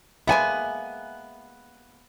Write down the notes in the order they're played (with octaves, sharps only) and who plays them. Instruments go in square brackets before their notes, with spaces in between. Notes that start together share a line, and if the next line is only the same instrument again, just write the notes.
[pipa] G#3 A#3 B3 [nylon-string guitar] E5 F#5 G#5